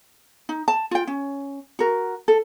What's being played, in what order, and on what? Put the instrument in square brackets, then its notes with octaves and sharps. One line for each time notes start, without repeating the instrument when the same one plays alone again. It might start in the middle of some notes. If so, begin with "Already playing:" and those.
[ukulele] D#4
A5
F4 G5
C#4
F#4 A#4
A4